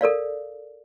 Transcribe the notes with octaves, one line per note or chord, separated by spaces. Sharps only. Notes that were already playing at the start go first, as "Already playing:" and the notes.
A4 A#4 D5 F5